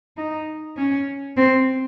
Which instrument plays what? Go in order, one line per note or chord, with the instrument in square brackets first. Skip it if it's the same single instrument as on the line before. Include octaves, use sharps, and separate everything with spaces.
[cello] D#4
C#4
C4